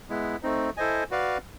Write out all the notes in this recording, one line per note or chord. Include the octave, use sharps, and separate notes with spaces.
G#3 B3 E4
A3 C4 D#4
E4 A4 C5 D#5 G#5
F#4 B4 D5 F5